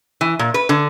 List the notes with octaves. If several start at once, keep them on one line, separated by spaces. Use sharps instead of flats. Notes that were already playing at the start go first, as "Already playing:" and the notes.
E3
A#2
B4
D3